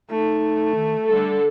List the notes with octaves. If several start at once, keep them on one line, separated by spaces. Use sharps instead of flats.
A3 D#4
D#3
D3 G3 A4